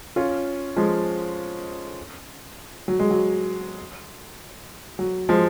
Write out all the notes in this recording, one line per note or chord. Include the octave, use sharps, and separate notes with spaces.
C#4 F4
F3 G#3
F#3
G#3
F#3
F#3
F3 G#3